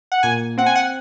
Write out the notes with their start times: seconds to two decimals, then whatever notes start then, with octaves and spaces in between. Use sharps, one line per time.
0.12 F#5
0.23 A#2 G#5
0.57 C4 F#5
0.66 G#5
0.75 F#5